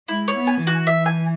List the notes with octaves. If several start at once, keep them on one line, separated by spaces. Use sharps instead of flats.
G#3 E4
C#5
B3
G#5
E3 F#4
E5
G#5